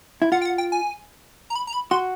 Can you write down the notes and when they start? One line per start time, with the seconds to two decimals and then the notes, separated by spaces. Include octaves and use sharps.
0.22 E4
0.32 F4 F#5
0.42 G5
0.45 F#5
0.58 G5
0.72 G#5
1.50 A#5
1.55 B5
1.67 A#5
1.73 B5
1.91 F#4 C6